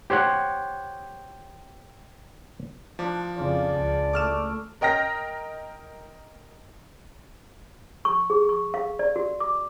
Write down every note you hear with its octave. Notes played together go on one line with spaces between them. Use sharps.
G4 C5 C#5 F#5
F3 D4 D5
F2 C#3 F4 D5
C#2
A3 D6 F6 E7
A#4 D#5 G5 F6 A#6
C#6
G#4
C#6
F5
D5
F#4
D6